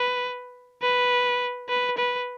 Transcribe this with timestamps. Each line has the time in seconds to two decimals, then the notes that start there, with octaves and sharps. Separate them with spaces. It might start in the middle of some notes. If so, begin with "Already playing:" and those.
Already playing: B4
0.82 B4
1.69 B4
1.97 B4